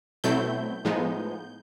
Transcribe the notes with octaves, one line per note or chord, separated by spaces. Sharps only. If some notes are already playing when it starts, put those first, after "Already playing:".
B2 F#3 A3 C4 E4 G6
A2 F3 G#3 B3 D#4